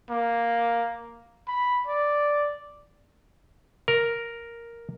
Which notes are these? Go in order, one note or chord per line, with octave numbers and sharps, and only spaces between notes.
A#3
B5
D5
A#4